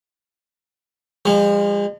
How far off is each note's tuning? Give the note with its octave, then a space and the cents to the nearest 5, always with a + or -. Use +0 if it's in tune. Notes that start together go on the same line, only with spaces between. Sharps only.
F3 +0 G#3 -40